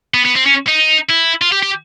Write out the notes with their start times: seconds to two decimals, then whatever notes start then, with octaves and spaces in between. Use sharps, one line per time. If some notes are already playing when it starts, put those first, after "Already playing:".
0.14 B3
0.25 B3
0.36 C4
0.46 C#4
0.67 D#4
1.09 E4
1.42 F4
1.52 G4
1.63 G4